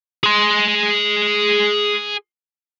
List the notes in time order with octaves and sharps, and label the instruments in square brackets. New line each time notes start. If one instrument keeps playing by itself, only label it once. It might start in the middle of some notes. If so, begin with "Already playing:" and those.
[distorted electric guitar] G#4 C6